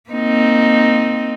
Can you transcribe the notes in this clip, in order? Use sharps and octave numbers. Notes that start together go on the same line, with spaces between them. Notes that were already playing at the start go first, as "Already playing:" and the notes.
A#3 C4 D#4